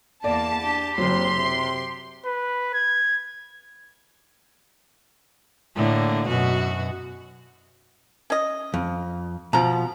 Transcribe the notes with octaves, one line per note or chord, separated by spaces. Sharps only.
E2 A#3 D5 A5
D4 G4
F#1 F#3 C4 C6
C3
B4
G#6
A2 D3 A#3
F#2 B2 F#4
C#4 D#5
F2
B2 F3 A#5